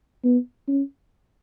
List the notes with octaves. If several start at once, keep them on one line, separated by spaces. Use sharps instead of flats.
B3
C#4